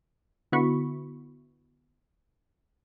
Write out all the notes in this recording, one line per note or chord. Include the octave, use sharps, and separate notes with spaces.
D3 B3 E4 F#4 B5 C#6